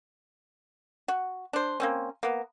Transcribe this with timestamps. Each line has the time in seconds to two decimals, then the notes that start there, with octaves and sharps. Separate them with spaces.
1.08 F#4
1.53 D4 C5
1.80 A#3 C4 C#4
2.23 A#3 B3